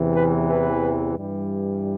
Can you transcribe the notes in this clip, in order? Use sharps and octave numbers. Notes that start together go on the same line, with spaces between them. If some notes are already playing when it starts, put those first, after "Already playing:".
Already playing: E2 C3 E3
B4
B4
G2 E3 G3